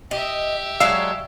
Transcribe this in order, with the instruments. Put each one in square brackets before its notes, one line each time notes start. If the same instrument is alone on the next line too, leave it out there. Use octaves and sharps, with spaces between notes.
[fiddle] G4 E5 [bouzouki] D#5
[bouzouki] F#3 G#3 D4 [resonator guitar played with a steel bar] F5 [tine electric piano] E6